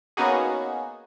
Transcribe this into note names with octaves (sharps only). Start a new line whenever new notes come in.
A#3 B3 C#4 D#4 F#4 G#4